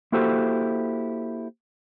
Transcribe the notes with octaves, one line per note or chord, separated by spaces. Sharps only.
A#3 E4 F#4 G4 A4 C5